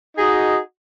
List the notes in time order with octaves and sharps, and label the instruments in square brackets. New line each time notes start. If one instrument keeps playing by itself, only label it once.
[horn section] D#4 F#4 G#4 D#5